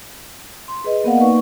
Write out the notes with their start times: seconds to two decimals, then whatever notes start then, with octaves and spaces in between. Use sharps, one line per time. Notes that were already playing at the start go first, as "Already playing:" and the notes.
0.68 C6
0.84 G#4 B4 D#5
1.04 A#3 B3 A#4 D5 F5 F#5
1.20 A#3 D#4 B4 D5 C#6